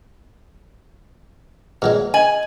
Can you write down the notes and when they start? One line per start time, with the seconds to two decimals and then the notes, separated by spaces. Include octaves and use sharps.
1.82 A#2 F#3 G#3 G#4 B4
2.14 D#5 G#5 F#7